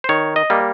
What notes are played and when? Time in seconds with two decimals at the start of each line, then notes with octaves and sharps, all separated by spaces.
0.04 C5
0.09 D#3 C#5
0.36 D#5
0.50 G3 A#3